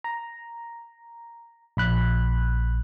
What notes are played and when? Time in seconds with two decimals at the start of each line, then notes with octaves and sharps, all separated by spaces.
0.04 A#5
1.77 A#1 B5 F#6